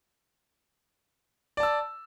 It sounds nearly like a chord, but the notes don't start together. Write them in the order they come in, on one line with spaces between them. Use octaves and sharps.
D5 A5 E6